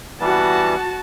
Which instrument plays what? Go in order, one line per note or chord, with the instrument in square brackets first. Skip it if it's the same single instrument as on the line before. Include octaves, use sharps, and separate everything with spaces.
[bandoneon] E3 G3 B3 [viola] F#4 A5